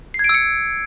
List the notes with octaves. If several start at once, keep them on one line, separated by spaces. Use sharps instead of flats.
C7
G#6
D7
E6
C#7